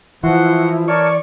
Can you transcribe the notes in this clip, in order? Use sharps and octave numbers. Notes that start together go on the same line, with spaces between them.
E3 F3 E4 F#4 F#5 C6
A#4 C#5 D5 A5 C#6